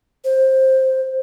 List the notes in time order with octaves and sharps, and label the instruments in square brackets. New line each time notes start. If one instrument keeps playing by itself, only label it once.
[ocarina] C5